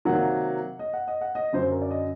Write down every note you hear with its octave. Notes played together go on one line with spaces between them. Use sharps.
C3 D#3 F#3 A#3 F#5
D#5
F#5
D#5
F#5
D#5
F#2 D3 F#3 C5
A#4
D5
D#5